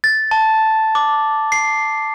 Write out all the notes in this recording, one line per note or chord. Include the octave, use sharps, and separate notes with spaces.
A6
A5
D6
C7